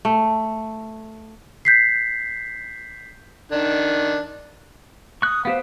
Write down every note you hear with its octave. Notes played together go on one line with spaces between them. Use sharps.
A3
G6 B6 C7
D#3 D4
C#6 D#6 F#6
B3 G4 C5 F5